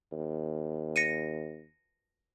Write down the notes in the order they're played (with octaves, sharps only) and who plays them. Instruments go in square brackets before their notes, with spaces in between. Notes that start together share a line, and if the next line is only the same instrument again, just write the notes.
[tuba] D#2
[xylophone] A#6 C#7 D#7